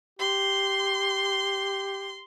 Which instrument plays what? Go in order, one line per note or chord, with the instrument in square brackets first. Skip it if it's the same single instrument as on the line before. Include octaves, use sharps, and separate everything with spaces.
[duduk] G4 [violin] C6